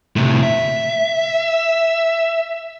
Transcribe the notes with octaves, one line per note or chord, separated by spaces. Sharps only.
A2 C3
E5